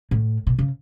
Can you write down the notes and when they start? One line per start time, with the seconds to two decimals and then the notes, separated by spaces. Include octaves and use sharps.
0.11 A2
0.47 B2
0.59 C#3